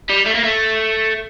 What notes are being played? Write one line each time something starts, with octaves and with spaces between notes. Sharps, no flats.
G3
A3
A#3
A3